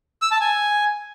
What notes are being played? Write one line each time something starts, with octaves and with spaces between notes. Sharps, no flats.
E6
A5
G#5